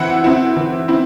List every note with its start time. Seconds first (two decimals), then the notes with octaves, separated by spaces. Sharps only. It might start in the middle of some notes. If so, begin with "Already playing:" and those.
Already playing: E3 C4 E4 F#5
0.24 C4 E4
0.57 E3
0.88 C4 E4